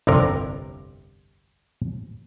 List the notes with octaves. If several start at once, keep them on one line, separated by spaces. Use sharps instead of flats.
G1 C2 F2 C3 A#4